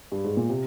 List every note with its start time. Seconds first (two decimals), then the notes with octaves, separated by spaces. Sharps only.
0.12 G2
0.24 G#2
0.37 A#2
0.50 C3